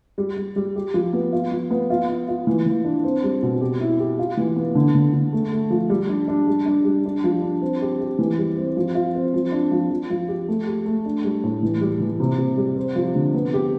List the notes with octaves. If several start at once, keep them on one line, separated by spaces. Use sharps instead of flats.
G3
G3
G3
G4
F3
B3
F4
F3
B3
F4
F4
F4
E3
E3
D4
C4
G3
B2
G4
E4
G4
F4
E3
B3
D3
D3
D3
A3
A3
F3
G3
D4
D4
G3
D4
G3
D4
F3
D4
C4
G4
G4
E3
G3
C4
F3
F4
C4
F3
D4
F3
F3
F3
G4
A3
G4
A3
D4
G3
A2
E3
G3
E3
C3
C3
G3
C4
F3
D3
B3
G4